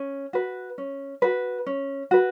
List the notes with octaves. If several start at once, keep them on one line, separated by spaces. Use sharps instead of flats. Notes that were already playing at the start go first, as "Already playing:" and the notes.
Already playing: C#4
F#4 B4
C#4
F#4 B4
C#4
F#4 B4